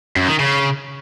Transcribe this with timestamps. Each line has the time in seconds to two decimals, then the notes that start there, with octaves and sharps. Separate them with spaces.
0.16 F#2
0.28 D#3
0.40 C#3